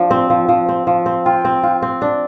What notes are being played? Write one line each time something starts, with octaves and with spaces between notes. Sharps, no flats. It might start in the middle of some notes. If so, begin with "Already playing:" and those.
Already playing: F3 D4
C4
F3
F3
C4
F3
C4
F4 G5
C4
F4
C4
D4